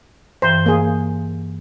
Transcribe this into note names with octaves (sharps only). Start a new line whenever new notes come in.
G2 E3 C5
A#3 G#4